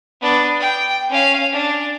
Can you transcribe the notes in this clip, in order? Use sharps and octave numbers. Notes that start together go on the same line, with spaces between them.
B3 D4
G5
C#4 F5
D4